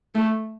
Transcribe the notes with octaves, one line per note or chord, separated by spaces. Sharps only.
A3